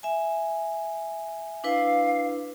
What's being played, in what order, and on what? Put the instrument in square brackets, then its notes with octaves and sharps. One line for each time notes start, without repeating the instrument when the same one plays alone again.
[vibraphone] E5 G#5
[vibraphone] D4 E4 B4 [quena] F5